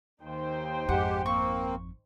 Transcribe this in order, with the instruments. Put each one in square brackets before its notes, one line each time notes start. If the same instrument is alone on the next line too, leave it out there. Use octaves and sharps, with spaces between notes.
[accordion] D#2 [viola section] D#4 C5 G5
[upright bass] G#1 F2 [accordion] G#3 G4 [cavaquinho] F#5
[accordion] A#3 C4 [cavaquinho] C#6